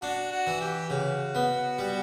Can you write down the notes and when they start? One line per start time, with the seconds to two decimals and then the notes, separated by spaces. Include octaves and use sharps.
0.02 D4 F#4
0.32 F#4
0.47 E3
0.61 G4
0.90 C#3 F#4
1.35 B3
1.79 G3